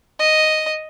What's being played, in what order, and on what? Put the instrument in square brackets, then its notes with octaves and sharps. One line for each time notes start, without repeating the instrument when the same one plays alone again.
[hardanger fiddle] D#5